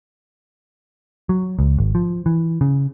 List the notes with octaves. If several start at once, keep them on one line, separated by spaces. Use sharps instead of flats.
F#3
C#2
G#1
F3
E3
C#3